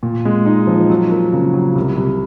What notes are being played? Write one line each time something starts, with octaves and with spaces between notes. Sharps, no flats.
A#2
G#3
D#4
F3
F#3
A#3
C#3
F#3
C2
C2